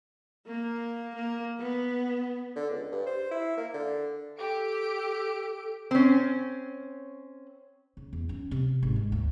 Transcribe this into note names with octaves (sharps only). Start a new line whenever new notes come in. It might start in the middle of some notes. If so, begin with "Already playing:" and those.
A#3
A#3
B3
D3
C#2
G2
C5
E4
A#3
D3
G4 A4 D7
C4 C#4
C#3
E2
C#4
C3
G#1
G#3
D2